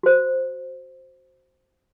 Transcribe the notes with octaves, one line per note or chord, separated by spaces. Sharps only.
F#4 C5